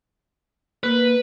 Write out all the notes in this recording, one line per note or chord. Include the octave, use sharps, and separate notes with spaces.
A#3 B4